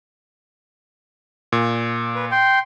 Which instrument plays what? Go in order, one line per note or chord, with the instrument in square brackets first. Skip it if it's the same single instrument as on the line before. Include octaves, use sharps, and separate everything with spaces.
[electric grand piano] A#2
[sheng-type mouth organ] B4
G5 C6